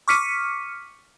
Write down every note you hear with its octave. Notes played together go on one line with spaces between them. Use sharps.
C#6 D6 F6 B6 C#7 D#7